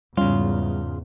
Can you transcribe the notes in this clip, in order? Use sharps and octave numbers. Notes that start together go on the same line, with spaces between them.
E2 G#2 C#3 G3 C#4 F4